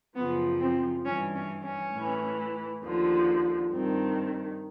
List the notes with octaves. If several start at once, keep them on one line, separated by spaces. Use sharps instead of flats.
F#2 C#3 F3 B3
C4
G2 E3 C#4
C#4
C#4
A2 E3
D#2 D3 F3
G2 D#3 C4